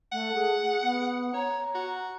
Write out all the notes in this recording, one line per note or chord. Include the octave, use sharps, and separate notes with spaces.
A3 F#5
G#4
B3
C#5 A#5
F#4